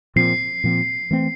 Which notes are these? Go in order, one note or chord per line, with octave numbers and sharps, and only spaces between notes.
A#2 F3 C4 C7
A#2 F3 C4
E3 A3 C4